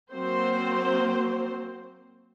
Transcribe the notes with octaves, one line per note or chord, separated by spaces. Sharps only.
F#3 A#3 C4 C5